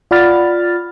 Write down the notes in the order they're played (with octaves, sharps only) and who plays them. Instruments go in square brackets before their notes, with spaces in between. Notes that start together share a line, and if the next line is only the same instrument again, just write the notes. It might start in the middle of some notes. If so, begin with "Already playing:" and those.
[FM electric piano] F4 D5 F#5 B5 F6 A6